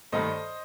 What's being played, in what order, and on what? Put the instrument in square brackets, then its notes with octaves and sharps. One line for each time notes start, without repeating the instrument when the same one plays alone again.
[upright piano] G2 D#3 A3 C5 D#5